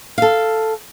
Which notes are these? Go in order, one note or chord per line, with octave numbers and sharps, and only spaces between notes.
A4 F5